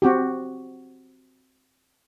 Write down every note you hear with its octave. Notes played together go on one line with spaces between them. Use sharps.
C4 F#4 G4